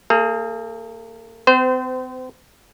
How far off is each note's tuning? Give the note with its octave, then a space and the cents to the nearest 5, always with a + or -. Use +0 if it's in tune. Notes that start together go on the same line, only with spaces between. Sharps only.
A#3 -35 G#4 +20
C4 -40 C5 -25